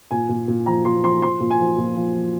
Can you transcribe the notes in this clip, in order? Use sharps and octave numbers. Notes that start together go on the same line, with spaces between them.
A#2 G#5
A#2
A#2
F3 A#5
A#2 C6
F3 C6
F3 C6
A#2
G#5
F3
A#2
F3
F3